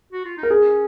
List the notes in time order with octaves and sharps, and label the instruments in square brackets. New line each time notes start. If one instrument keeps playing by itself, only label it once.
[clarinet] F#4
F4
D#4
[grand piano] A#4
[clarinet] C#4 [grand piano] G#4